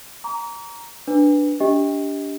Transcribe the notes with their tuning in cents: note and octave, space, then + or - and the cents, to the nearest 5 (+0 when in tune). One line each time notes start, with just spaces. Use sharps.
A#5 +0 D6 -45
D4 +0 B4 +0
D4 -30 G4 +0 D#5 +30